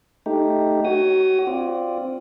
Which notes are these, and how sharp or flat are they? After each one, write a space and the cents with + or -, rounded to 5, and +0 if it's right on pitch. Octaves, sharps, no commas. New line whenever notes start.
A3 +0 D#4 +0 G4 +0
F#4 +30 C#5 +0 D#6 +0
C4 +0 F4 +0 D5 +0